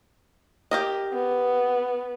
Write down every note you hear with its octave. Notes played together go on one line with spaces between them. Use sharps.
G4 A#4 D#5
B3